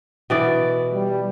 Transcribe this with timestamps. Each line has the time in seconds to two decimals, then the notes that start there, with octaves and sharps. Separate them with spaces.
0.30 B2 E3 D5
0.93 G3